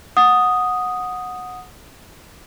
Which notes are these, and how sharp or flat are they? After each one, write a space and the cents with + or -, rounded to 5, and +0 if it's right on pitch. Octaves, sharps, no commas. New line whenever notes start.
F#5 -15 D#6 +0